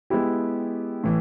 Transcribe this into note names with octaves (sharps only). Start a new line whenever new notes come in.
G#3 B3 E4 G4
A2 E3